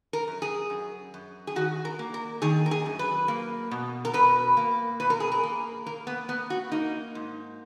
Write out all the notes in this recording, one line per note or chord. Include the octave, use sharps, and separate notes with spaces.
A#4
F#2
G#4
F#2
F#2
G#4
D#3 F#4
A#4
A#3
A#4
D#3 G#4
A#4
G#4
F#2
B4
A#3
B2
A#4
B2 B4
A#3
B2 B4
A#4
G#4
A#4
A#3
A#3 A#4
B3
A#3 B3
F#4
A#3 D#4
G#2